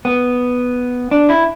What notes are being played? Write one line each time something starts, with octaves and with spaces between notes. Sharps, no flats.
B3
D4
E4